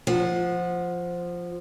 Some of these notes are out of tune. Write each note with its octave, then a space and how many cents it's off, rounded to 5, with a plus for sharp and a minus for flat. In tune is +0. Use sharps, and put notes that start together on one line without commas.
F3 +0 F#5 -20